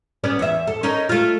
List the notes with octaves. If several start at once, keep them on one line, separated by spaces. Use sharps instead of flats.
B3 C#4 D5
E2 E5
A4
C#4 D#4 A#4
A3 F4